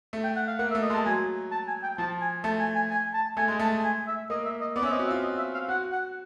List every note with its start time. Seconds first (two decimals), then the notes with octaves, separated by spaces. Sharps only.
0.13 A3
0.24 G5
0.36 F#5
0.47 F5
0.59 A#3 F#5
0.71 E5
0.75 A3
0.82 D#5
0.90 G#3
0.94 A5
1.06 F#3 G#5
1.51 A5
1.67 G#5
1.83 G5
1.98 F3 A5
2.21 G#5
2.44 A3 A5
2.59 G#5
2.75 G#5
2.91 G#5
3.14 A5
3.37 A3 G#5
3.48 G#3
3.59 A3 A5
3.84 G#5
4.07 E5
4.30 A#3 D#5
4.45 E5
4.61 D#5
4.76 B3 D5
4.83 C#4
4.85 E5
4.89 C4
4.92 D#5
4.99 F#4
5.07 E5
5.11 F4
5.23 D#5
5.38 E5
5.54 F5
5.68 F#4 F#5
5.92 F#5